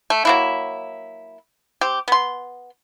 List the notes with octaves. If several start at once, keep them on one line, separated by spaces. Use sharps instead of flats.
A3
F#3 A#3 E4
C4 G4
B3 C6